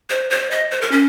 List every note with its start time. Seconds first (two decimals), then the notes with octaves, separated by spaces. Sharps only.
0.10 C5
0.30 C5
0.51 D#5
0.71 C5
0.81 A#4
0.92 C#4